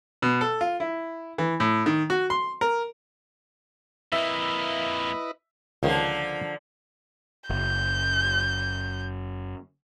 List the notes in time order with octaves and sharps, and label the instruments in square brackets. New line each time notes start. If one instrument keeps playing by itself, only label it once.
[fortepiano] B2
A4
F4
E4
E3
A2
D#3
F#4
C6
A#4
[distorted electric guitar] F2 A#3 [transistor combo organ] E4 B4 D#5 [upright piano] E5
[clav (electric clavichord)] C#2 D#3 [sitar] D3 F3 A#3
[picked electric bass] F#1 [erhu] G6